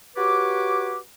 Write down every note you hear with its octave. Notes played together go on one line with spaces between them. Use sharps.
F#4 G4 B4 C#5 D6